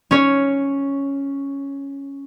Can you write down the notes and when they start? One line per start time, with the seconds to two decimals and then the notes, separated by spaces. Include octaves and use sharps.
0.11 C#4 C#5